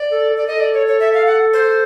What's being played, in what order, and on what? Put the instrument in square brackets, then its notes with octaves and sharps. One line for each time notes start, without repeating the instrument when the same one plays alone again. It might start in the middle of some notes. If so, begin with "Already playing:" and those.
Already playing: [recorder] D5
[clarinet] A4
A4
[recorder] D5
[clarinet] A4 [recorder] D#5
[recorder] D5
C#5
C#5
E5
F5
F#5
C5